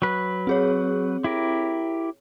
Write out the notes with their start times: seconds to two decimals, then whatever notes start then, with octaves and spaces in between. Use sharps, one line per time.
0.02 F#3 B4
0.47 C4 G#4 C#5
1.24 E4 G4 A#4